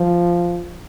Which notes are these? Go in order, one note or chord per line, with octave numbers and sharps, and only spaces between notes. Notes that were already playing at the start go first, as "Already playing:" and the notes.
Already playing: F3